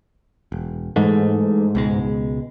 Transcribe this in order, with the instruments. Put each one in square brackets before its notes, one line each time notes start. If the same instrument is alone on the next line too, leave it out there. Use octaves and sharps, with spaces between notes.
[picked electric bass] E1
[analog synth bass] G#2 [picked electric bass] E3 G#3 A3
[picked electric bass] C#2 B2 G#3